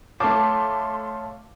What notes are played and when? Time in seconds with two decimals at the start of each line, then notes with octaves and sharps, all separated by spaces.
0.20 A3 C#5 F5 A5 C6 D6